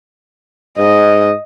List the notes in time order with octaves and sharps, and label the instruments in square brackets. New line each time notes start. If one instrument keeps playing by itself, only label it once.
[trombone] G#2 [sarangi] D#5